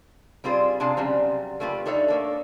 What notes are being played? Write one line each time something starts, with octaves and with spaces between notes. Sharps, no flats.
G3 C4 F4 G#4 C5
C3 D4 G#4 F5 A5
C#3 F#3 G3 C4
A3 A#3 F4 G4 B4
D4 D#4 A4 C#5 E5
A3 A#3 A4